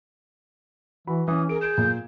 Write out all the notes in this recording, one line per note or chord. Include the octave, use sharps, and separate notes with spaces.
E3 F#4 B5
E3 C#4 D#6
G#4 A#4 D7
G6 G#6 D7 E7
A#2